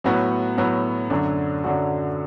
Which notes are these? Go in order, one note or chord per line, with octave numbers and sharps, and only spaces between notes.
A2 F#3 B3 F#4
A2 F#3 B3 F#4
F#2 D3 F#3 D4 F#4
F#2 D3 F#3 D4 F#4